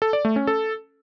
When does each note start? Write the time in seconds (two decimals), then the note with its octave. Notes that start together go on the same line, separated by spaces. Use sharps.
0.02 A4
0.13 D5
0.25 A3
0.36 C#4
0.47 A4